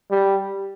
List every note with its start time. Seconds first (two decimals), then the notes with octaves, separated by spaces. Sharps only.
0.11 G3